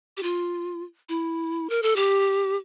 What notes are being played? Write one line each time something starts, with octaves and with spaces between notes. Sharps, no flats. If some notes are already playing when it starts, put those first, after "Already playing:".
G4
F4
E4
A#4
A4
G4